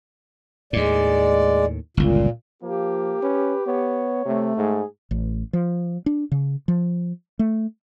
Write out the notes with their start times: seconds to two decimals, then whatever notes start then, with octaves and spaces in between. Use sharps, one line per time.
0.73 D#2 A2 G#3 D5
1.97 G1 C#2 A#2
2.63 F3 A#3 G4
3.22 C#4 B4
3.67 B3 C#5
4.25 C3 A3
4.57 G#2 G#4
5.11 A1
5.53 F3
6.06 D4
6.32 C#3
6.68 F3
7.39 A3